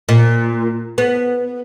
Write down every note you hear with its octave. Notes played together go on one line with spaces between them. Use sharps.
A#2
B3